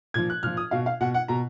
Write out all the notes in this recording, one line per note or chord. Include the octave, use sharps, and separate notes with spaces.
A#2 F3 G#6
F#6
A#2 F3 F6
D#6
B2 F5
F5
B2 F#5
F#5
B2 A#5